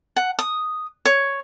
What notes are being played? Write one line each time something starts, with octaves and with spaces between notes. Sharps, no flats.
F#5
D#6
C#5